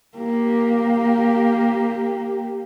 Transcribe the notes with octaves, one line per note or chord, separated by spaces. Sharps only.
A#3 G4